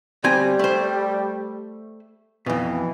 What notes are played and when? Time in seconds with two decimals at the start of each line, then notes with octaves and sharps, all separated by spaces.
0.24 D2 G3 C4 G#5
0.59 A3 C5
2.46 F2 B2 E3